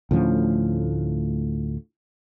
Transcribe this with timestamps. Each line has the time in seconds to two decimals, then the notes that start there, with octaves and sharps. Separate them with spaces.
0.11 D2 A2 F3 C#4